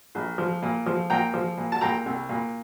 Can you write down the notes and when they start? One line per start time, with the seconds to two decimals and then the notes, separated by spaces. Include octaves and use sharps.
0.15 A#1
0.38 F3
0.62 A#2
0.86 F3
1.10 A#2 G5 A#5
1.34 F3
1.58 A#2
1.72 A5
1.81 A#2 G5 A#5
2.06 C2
2.29 A#2